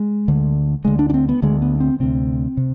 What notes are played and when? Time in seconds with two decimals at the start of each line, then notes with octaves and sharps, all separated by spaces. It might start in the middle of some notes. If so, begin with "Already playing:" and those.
Already playing: G#3
0.28 D2 D3
0.85 D2 D3 G#3
0.99 D4
1.10 D4
1.14 C4
1.29 B3
1.42 D2 D3 G#3
1.62 B3
1.80 C4
2.00 D2 C3 C4
2.57 C3